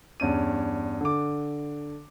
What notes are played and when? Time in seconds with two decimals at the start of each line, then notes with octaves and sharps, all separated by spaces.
0.20 E2 G2 C#4 D#7
1.01 D3 D6